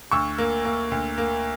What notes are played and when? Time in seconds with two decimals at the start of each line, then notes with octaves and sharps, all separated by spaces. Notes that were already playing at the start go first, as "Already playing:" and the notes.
0.11 D2 C#6 E6
0.38 A#3
0.65 A#3
0.91 D2
1.18 A#3